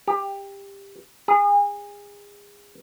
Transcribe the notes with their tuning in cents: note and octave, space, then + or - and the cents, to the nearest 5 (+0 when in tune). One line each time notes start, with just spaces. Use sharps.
G4 +20
G#4 -30